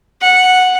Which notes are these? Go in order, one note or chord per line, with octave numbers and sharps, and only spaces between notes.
F#5